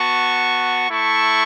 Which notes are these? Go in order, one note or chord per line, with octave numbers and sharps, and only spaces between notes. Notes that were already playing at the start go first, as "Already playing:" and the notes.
Already playing: B3 F#4 A5 C#6
A3 E4 A5 C#6